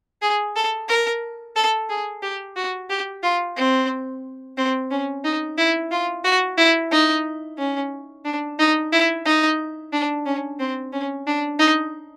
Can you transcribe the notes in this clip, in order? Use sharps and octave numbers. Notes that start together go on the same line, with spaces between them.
G#4
A4
A#4
A4
G#4
G4
F#4
G4
F4
C4
C4
C#4
D#4
E4
F4
F#4
E4
D#4
C#4
D4
D#4
E4
D#4
D4
C#4
C4
C#4
D4
D#4